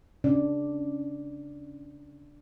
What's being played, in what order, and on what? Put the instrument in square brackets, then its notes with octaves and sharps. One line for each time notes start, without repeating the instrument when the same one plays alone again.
[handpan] C#3 D4 D5